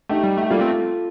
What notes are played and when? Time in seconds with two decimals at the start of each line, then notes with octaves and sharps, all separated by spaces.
0.09 A3 D#4 G4
0.24 G3
0.37 A3
0.42 G4
0.50 G3 A#3 F4 A4
0.60 A3 C4